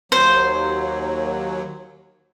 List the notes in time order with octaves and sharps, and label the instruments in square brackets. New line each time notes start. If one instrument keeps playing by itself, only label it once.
[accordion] D#2 F#3 [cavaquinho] C5